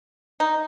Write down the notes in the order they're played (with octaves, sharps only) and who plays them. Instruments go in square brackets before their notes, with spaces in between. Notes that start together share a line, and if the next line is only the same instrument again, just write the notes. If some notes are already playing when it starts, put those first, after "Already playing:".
[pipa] D#4